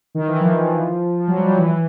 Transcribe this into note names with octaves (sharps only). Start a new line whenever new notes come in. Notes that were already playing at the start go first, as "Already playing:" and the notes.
D#3
E3
F3
F3
F#3
G3
F#3
E3